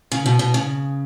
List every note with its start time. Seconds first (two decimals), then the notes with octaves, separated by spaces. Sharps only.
0.12 C#3
0.26 B2
0.39 B2
0.54 C#3